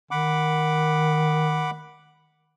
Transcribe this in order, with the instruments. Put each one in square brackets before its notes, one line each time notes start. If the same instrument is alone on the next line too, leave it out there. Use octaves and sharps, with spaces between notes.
[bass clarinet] D#3 [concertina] F#5 B5 D6